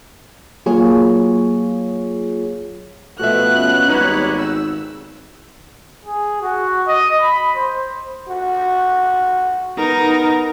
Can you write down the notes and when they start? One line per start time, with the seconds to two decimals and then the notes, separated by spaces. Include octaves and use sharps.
0.66 F#3 A#3 F4 G#4 C#5
3.19 B2 F3 A3 B3 F#4 E5 F#6
3.56 C#4
3.88 G#1 G3 D#4 B4 C#5
4.38 E6
6.05 G#4
6.42 F#4
6.88 D#5
7.21 B5
7.56 C5
8.28 F#4
9.78 B3 D#4 A#4